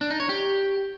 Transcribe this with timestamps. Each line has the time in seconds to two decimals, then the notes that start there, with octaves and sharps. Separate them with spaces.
0.01 D4
0.10 D#4
0.20 C#5
0.29 G4